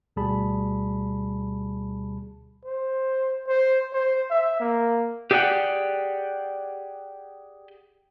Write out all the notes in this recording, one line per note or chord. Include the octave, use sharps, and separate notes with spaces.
D2 B2 G3 G#4 A5 B5
C5
C5
C5
E5
A#3
G4 G#4 D5 E5 F#5 G5